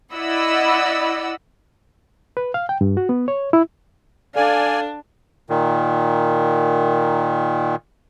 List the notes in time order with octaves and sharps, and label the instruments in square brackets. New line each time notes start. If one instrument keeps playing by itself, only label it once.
[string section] E4 D5 D#5 F#5 B5 E6
[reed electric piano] B4
F5
G5
G2
F#4
B3
C#5
E4
[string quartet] D4 [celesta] A4 [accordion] D5 G#5 [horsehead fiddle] F5
[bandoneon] A#2 D#3